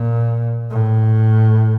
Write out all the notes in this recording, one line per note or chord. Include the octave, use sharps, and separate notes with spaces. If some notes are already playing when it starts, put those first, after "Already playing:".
Already playing: A#2
A2